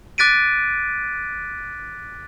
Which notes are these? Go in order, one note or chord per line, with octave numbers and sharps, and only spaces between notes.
D6 F#6 A6 B6 D7 D#7